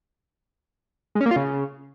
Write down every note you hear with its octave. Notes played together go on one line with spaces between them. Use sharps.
G#3
C#4
A#3
F4
C#3